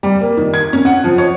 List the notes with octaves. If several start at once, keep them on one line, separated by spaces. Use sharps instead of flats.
G3
A#3
D#3
G#6
C#4
F#5
F3
C#5